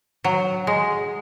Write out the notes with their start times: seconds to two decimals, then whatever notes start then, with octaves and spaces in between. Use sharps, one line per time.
0.24 F#3
0.67 G#3